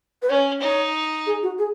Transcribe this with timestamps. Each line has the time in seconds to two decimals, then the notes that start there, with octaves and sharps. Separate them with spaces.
0.22 B4
0.29 C#4 C#5
0.61 D#4 C#5
1.26 G#4
1.43 F#4
1.59 G#4